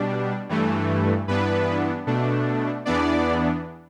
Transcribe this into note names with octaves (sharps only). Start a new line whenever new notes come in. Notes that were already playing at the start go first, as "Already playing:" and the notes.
Already playing: B2 G3 D4
G2 E3 A3
G2 E3 B3 D4 B4
B2 A3 D4
E2 E3 B3 D4 D5